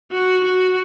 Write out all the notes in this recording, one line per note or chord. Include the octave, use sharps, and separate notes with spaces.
F#4
F#4